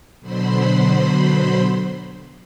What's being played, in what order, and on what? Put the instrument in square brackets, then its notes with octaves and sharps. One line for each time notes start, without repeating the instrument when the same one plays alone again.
[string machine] B2 D3 F#3 C5 B5 C6